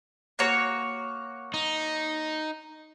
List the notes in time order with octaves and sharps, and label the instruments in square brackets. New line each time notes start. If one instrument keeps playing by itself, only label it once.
[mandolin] A#3 F#4 C#5
[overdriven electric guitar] D#4